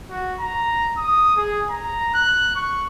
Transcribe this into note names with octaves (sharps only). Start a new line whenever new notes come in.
F#4
A#5
D#6
G#4
A#5
F#6
C#6